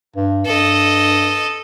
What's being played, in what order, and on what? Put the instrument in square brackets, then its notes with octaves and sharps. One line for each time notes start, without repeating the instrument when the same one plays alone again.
[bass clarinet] G2
[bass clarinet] G2 [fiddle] A4 D#5